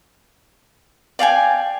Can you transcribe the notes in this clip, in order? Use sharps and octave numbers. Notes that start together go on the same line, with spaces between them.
D5 F5 G5 G#5